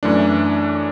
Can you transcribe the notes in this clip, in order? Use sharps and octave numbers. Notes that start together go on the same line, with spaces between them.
F#2 E3 A3 D4